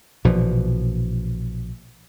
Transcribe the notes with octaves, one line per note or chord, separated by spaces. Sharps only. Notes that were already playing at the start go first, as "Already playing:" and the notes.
A#1 B2 E3 F3